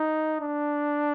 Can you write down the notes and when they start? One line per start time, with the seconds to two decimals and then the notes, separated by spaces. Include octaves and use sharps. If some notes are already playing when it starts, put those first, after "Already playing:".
Already playing: D#4
0.41 D4